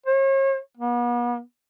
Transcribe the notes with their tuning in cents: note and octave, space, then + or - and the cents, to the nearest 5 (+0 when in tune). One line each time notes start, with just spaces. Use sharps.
C#5 -40
B3 -40